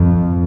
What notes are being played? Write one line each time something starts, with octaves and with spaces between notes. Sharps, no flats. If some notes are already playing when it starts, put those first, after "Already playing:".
Already playing: F2